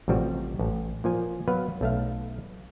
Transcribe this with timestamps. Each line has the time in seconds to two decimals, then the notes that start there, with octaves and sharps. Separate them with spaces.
0.08 A1 C3 F3 G3 F#4
0.59 A1
1.04 A#2 F3 G#5
1.48 F#3 B3 B4 F5
1.81 B1 A3 F5